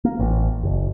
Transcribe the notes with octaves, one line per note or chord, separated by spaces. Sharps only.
A#3
A1
F#1